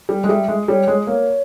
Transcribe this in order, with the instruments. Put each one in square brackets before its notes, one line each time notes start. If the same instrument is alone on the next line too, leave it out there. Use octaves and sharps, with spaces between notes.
[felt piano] G3
G#3
[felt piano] G3 [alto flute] E5
[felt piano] G#3
[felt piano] G3 [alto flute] C#5
[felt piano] G#3
[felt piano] A#3 [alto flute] C#5